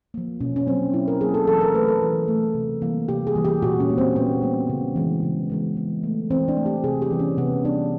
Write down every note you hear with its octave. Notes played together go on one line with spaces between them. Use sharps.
F3 A#3
B2 C#4
C#4
F#3 A#3 C4
B2 E4
A#4
F#3 A#3 G#4
A4
E3 A4
A#4
A3 B4
A4
E3
A3
C3
E3 G3 A#3
C3 G4
G#4
E3 G3 A#3
G4
A#2 F#4
C#4
G3 A#3
C4
A#2 B3
G3 A#3
C#3
E3 G#3 B3
C#3
E3 G#3 B3
E3
A3
E3 C4
D4
A3
G4
C3 G#4
G4
E3 G3 B3
C#4
C3 B3
E3 G3 B3 D4